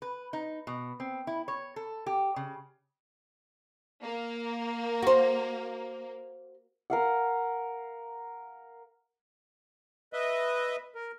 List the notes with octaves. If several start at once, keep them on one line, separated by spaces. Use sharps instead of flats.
B4
D#4
B2
C4
E4
C#5
A4
G4
C#3
A#3
F#4 C5
A#4 F5 F#5
B4 D#5 E5
A#4